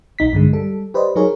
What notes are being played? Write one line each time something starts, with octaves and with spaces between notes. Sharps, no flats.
B1 D#4 B6
G2 D3 G#3
G3 A4
G4 B4 C5 D5 D#5
F#3 D#4 G#4 A#4 C#5